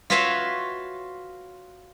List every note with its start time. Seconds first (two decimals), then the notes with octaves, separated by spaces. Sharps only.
0.10 F4 F#4 B4 C#5 E5 F5